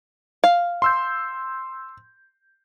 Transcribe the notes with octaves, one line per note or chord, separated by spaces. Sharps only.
F5
C6 E6 G6